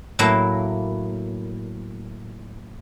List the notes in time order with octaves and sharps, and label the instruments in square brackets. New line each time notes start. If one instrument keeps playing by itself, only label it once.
[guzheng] A2 F#3 A#3 E4